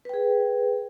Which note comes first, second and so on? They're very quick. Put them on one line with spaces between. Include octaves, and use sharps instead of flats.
B4 G5 G#4